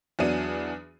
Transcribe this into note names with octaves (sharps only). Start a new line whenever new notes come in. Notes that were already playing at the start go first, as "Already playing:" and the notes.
E2 F#3 B3 D4 D#7